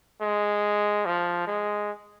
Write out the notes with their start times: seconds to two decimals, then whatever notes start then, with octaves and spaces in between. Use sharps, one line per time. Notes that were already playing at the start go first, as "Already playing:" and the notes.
0.21 G#3
1.06 F3
1.47 G#3